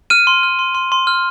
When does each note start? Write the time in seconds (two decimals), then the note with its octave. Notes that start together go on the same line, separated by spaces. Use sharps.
0.10 F6 D#7
0.27 C6
0.43 F6
0.59 C6
0.75 C6
0.92 C6
1.07 F6